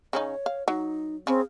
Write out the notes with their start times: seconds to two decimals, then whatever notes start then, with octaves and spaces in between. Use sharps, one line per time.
0.13 C#3 C#4 D#4 C#5
0.46 F5
0.68 F#3 D#4
1.27 C#3 C4 G#4